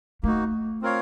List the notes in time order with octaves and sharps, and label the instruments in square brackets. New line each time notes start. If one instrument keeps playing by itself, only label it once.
[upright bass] A3 [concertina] A#3 D#4 F#4
[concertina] C4 F4 A#4 C#5 F5